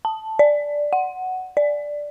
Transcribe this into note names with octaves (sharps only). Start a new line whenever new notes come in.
A5
D5
F#5
D5